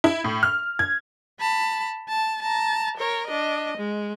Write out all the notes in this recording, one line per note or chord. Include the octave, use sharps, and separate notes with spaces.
E4
A2
F6
G#6
A5 B5
A5
A5 A#5
A#4 C#5
D4 D#5
G#3